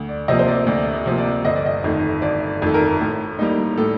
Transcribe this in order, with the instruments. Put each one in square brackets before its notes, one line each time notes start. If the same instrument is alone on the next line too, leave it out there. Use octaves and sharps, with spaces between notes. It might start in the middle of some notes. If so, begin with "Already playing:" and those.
Already playing: [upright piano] D2
D5
C3 F3 A#3 D#5
C5
D5
D2 D5
C3 F3 A#3
D5
G1 D#5
D5
D#5
F2 D#3 A3
G1 D5
F2 D#3 A3 A4
A#4
A2
G3 A#3 D#4
A2 A4